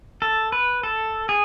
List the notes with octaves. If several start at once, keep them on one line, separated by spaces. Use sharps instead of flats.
A4
B4
A4
G#4